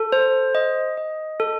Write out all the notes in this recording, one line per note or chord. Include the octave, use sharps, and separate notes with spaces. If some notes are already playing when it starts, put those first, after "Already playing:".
Already playing: A4
C5
D#5
D#5
A4